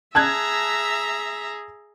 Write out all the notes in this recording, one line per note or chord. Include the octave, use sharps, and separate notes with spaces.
G#4 E5 A5 A#5 F#6 G#6